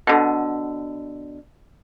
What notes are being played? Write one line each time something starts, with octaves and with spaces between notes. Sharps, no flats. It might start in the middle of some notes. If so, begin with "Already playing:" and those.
B2 D3